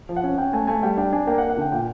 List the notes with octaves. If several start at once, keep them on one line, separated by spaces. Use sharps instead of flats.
F3
F#5
C#4
C#4 G5
A3 G#5
A3 G#5
G3 G5
D4 G5
D4 G#5
A#3 G5
F#5
A#3
F#5
D3 G5
A#2 G5